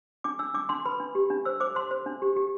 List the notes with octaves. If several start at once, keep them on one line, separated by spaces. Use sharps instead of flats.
D4 D6
D4 E6
D4 D6
D4 C6
B4 B5
D4
G4
D4
C5 E6
C5 D6
C5 C6
C5
D4
G4
G4